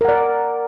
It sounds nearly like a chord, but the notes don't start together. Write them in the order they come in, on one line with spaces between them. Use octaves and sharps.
A#4 F#5 D5